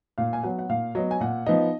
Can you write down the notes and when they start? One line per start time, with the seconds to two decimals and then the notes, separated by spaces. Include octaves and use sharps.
0.18 A#2 F5
0.33 G#5
0.43 F#3 B3 F#5
0.59 F#5
0.69 A#2 F5
0.95 F#3 B3 D#5
1.11 G#5
1.20 A#2 F#5
1.46 F3 B3 D#4 D#5